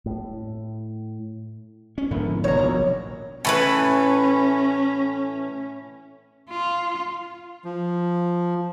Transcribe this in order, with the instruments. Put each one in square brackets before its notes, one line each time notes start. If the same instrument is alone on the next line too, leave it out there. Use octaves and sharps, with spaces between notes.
[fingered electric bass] A2
[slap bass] C#4
[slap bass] G#2 F3 B3 [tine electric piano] D3 E4 A#4
[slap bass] F1 [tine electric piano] B2 D#3 F#3 [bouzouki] C#5 A#5
[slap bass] A#1
[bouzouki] A2 E3 B4 [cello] C#4
[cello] F4
[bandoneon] F3